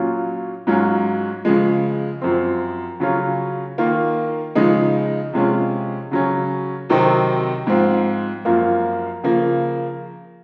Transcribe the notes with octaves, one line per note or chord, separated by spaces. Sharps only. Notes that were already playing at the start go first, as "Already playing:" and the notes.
Already playing: A#2 F#3 C#4 F4
G#2 F#3 C#4 F4
C#3 F3 G#3
F#2 F3 C4
C#3 F#3 C#4 F4
D#3 A#3 F4
C#3 F3 G#3 D#4
C3 F3 G#3 C#4 F4
C#3 F#3 C#4
C3 D#3 F#3 C4 D#4
G#2 F3 C4 F4
F#2 F3 A#3 F4
C#3 F3 A#3